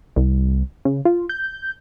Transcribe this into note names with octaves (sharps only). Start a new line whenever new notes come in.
C2
C#3
F4
G6